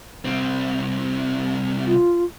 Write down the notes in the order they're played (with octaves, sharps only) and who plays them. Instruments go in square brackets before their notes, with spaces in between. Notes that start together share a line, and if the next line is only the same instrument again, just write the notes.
[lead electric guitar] C2 C4
[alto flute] F4